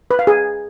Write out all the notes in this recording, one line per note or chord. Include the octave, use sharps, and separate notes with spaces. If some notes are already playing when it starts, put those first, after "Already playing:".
B4
F5
G#4